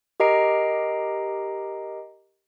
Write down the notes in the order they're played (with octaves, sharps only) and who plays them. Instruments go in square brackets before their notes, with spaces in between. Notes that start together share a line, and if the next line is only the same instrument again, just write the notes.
[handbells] G4 A#4 D#5 A#5 C7 D7